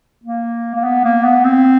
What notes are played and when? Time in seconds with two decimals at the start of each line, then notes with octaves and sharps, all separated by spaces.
0.24 A#3
0.75 A#3
0.84 B3
1.04 A#3
1.24 B3
1.44 C4